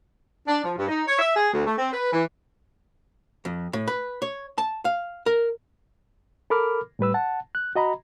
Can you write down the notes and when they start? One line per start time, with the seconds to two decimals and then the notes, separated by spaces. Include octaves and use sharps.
0.47 D4
0.63 F3
0.76 G2
0.88 D#4
1.07 C#5
1.18 E5
1.34 G#4
1.53 D2
1.65 A3
1.76 C4
1.91 B4
2.13 E3
3.45 F2
3.73 A2
3.88 B4
4.22 C#5
4.58 A5
4.85 F5
5.26 A#4
6.50 A4 A#4 B5 D6 F6
6.99 A2 G3 B4 E6
7.14 F#5 A5
7.55 F#6
7.76 F#4 D#5 A#5 B5